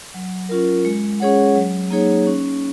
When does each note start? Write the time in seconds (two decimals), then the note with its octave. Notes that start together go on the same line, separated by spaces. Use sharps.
0.14 F#3
0.49 C#4 F4 A#4
0.85 G#3
1.20 C#4 G#4 C#5 F#5
1.55 F#3
1.91 A#3 D#4 G#4 C#5
2.27 C#4